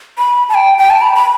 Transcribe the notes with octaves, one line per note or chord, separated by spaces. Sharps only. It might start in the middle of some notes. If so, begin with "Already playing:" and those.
B5
A5
G5
G5
A5
B5
B5